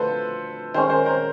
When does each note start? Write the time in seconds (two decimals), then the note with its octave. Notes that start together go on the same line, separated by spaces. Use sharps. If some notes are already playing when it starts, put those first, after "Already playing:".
Already playing: D2 D3 F3 A4 B4 C5
0.74 D#3 G#3 C#4 A#4 C5
0.90 A#4 C5
1.06 A#4 C5